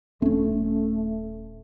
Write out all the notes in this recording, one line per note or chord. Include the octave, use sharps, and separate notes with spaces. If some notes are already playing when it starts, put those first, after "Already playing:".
D#1 A3 C4 C#4